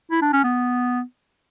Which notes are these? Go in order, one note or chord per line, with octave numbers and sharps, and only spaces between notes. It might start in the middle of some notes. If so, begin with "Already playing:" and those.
E4
D4
C#4
B3